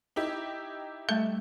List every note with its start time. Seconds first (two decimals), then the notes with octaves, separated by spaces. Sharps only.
0.16 D#4 E4 G4
1.09 G3 A3 A4 E5 A5